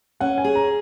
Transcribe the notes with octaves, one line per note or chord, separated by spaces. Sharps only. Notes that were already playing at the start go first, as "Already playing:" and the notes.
C#4 F#5
G#5
G#4
A#5